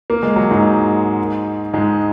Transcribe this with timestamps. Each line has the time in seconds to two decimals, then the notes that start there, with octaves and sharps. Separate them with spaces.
0.10 A#3
0.23 G#3
0.36 F#3
0.51 G#2 G#3
1.73 G#2 G#3